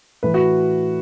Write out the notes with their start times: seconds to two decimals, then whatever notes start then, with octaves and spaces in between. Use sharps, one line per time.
0.23 A2 E3 B4
0.34 F#4